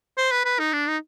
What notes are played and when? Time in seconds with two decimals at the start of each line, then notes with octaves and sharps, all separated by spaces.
0.18 C5
0.32 B4
0.45 B4
0.59 D#4
0.73 D4
0.88 D#4